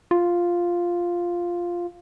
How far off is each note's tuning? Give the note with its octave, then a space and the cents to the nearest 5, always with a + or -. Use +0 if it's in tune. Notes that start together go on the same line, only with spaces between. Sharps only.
F4 +0